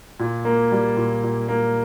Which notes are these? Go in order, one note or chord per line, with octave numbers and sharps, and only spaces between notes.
A#2
A#3
G3
A#2
A#2
A#3